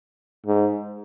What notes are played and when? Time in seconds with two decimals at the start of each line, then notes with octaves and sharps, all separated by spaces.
0.47 G#2